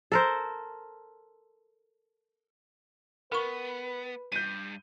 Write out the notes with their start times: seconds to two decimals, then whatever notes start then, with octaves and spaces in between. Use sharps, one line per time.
0.12 A4 A#4 C5
3.32 B3 A#4 B4 B5 C#6
4.32 G2 G6 D#7